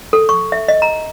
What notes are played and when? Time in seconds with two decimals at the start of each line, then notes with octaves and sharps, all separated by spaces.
0.13 A4
0.29 C#6
0.52 E5
0.68 D#5
0.82 A#5